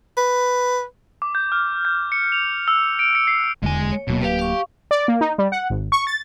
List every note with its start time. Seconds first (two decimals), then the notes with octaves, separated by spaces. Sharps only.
0.17 B4
1.22 D6
1.35 G6
1.52 F6
1.85 G6
2.12 C#7
2.32 F7
2.68 E6
2.99 D7
3.15 C#7
3.28 C7
3.62 D#1 E2 D3 G#3 G#5
3.92 C#5
4.08 D1 B2 F#3 A#3
4.21 G4 B4 F5
4.39 F5 C#6
4.91 D5
5.08 A#3
5.21 D#4
5.38 G3
5.52 F#5
5.70 G#1
5.92 C#6
6.07 A6